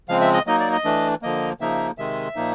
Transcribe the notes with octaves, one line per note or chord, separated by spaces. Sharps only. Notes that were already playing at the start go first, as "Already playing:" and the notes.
C#3 F3 G#3 C4 F5
E5
D#5
F#3 A#3 D#4 D#5
D5
D#5
E3 A3 D4
D3 F3 A#3 D#5
C#3 F3 A#3 D#4 E5
C3 D#3 G#3 E5
A#2 F3 A#3 D#4